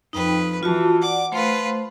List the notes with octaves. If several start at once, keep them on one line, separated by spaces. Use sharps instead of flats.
F2 D#4 B4 G5
E3 F4 F#4 A5
D5 F#5 D6
A3 F4 B4 C5